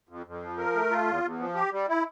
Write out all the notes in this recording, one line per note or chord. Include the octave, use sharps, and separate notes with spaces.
F2
F2
F3
A#4
A3
F4
E2
E2
F3
G4
G3
E4